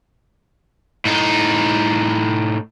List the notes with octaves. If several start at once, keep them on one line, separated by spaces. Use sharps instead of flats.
A2 D#4